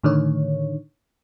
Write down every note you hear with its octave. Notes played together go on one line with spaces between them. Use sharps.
A2 D3 D#3 C#5